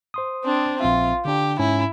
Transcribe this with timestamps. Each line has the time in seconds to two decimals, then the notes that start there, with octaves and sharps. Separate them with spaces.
0.14 C5 C6 D#6
0.44 C4 D4
0.80 A#1 C4 F4 E5
1.25 D3 D4 G4
1.59 G#2 C#4 E4 G#5